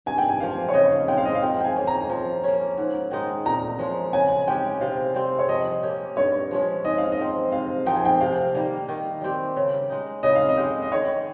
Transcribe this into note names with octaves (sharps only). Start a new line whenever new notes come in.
G2 G#5
G5
G#5
F3 A#3 F5
C#5
C#3 D#5
F5
G#3 C4 D#4 G5
F5
D#5
F5
F3 G5
G5
G#5
A#3 C#4
A#5
F3
A#3 C#4
G#2
D#3 G#3 D#4
A#2 A#5
F3 G#3 C#4
C#3 G#5
G#3 C#4 G4 G5
C3 F5
G3 C4
C#5
F3 D#5
A#3 C#4 G4
G2 C#5
F3 G#3 C#4
G#2 D#5
F5
D#5
F3 C4
C3 F5
F3 A#3 D#4 G5
G#5
G5
C3 F5
D#3 G3 A#3
D#3
G3 C4 G4
C#3
G#3 D#4
C#3 D#5
F5
D#5
G#3 D#4 G4
D#5
D#3 C#5